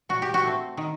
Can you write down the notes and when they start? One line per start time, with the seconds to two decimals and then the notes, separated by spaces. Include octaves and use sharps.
0.09 A#2 F#4
0.22 G4
0.34 F#4
0.44 A3 C4
0.77 D#3